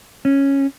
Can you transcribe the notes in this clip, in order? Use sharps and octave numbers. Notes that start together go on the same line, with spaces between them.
C#4